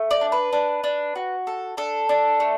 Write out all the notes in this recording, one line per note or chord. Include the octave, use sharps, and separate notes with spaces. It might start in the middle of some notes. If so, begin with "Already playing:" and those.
Already playing: A3
D5
D4
B4
D4
D4
F#4
A4
D4 A4
D4
A3